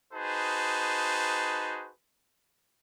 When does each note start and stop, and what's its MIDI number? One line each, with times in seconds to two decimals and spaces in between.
0.13 1.91 63
0.13 1.91 66
0.13 1.91 68
0.13 1.91 71
0.13 1.91 72
0.13 1.91 81